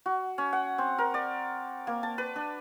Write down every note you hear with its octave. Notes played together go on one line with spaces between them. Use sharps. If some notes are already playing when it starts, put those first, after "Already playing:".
F#4
C#4
F#5
C4
A#4
D5
A#3
A5
B4
D4